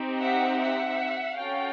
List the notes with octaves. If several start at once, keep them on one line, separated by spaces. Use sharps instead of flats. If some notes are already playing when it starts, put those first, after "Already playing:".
Already playing: C4 D#4 G4
E5 F#5
E5 F#5
C#4 F#4 A4 F5 G5